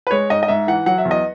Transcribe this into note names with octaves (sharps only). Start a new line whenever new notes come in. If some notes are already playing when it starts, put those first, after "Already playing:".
B4
G#3 C#5
G#2 D#5
D#5
G#2 E5
E3 F#5
F#3 F#5
E5
E2
D#5